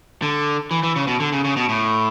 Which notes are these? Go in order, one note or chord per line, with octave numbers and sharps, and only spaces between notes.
D3
E3
E3
C#3
B2
D3
C#3
C#3
B2
A2